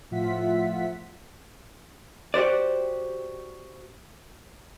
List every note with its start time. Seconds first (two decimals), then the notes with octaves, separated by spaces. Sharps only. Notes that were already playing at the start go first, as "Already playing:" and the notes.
0.11 A2 F3 F4 E5 F#5 B6
2.34 F#4 G4 C5 D5